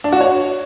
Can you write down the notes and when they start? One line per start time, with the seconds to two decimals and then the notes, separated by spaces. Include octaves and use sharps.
0.04 D4
0.12 F#4
0.21 C#5